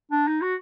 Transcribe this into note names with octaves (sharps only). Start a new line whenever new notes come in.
D4
D#4
F#4